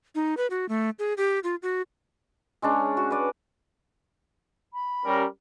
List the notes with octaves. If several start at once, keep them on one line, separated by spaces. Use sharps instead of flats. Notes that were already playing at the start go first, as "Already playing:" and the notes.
D#4
B4
F#4
A3
G#4
G4
F4
F#4
G#3 C#4 D4
F#4
B4 D5
B5
G3 C#4 G4 A#4